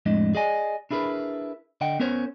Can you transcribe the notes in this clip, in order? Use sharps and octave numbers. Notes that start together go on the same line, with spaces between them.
F2 A2 G#3 D4 D#5
G#4 D5 D#5 G#5
D4 E4 G#4 A#4 B4
D3 D#5 F#5 G5
B3 C#4 A#4 C5 C#5